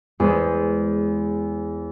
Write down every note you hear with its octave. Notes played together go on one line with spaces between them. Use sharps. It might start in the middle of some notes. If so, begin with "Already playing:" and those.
E2 G#3 C5